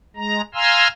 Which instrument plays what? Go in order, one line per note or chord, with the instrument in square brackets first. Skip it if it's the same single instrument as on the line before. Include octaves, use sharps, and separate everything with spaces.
[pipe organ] G#3 A#5
F5 G#5 A#5 C6 E6 F6